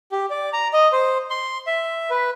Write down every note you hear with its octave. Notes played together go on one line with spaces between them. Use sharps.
G4
D5
A#5
D#5
C5
C6
E5
B4